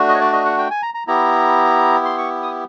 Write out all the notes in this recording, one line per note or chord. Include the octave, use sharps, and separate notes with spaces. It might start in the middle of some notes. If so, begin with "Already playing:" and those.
Already playing: A3 D4 F#4
D#5
C#5
D5
D#5
F#5
G5
G#5
A#5
A#5
B3 E4 G4 A#5
C6
C#6
D#6